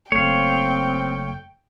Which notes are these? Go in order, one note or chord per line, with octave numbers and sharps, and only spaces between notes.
F#1 D#2 A3 C4 C#5 F5 G5